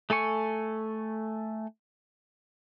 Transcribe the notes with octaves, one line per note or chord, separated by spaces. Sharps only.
A3 A4 G#5 C#6